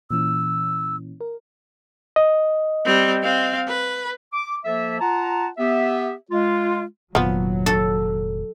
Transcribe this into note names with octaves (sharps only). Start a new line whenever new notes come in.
A#2 E3 C#4 E6
A#4
D#5
G3 C4
C4 F5
B4
D6
F3 A#3 A4 E5
F4 F#5 A5 A#5
B3 G4 E5
G#3 F4
F1 A#2 D#3 F3 F#3 B3
A4